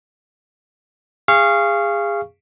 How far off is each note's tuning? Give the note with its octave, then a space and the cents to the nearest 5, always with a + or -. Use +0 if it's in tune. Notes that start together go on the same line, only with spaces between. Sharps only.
G#4 -25 F5 -20 C#6 +0